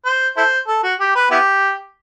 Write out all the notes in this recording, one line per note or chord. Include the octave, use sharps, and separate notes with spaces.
C5
E4 A4 C5
A4
F#4
G4
B4
B3 E4 G4